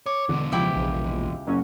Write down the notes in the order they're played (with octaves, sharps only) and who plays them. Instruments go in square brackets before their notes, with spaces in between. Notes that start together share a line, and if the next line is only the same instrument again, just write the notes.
[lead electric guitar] C#5 [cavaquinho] D6
[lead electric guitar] E2 B2 [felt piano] D3
[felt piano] C#2 [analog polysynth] F3 [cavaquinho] E4 G4 E5
[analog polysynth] A#1
[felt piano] F#1 [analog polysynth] F#3 C#4